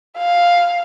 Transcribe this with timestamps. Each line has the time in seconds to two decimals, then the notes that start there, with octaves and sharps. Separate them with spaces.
0.18 F5